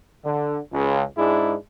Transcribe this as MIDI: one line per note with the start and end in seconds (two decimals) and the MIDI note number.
0.24 0.59 50
0.73 1.04 37
1.17 1.55 44
1.17 1.55 56
1.17 1.55 62
1.17 1.55 64